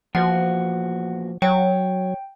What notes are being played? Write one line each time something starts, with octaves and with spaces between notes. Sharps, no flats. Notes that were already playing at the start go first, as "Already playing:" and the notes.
E2 A#2 F3 F#4 F#5
F#3 C#5 G5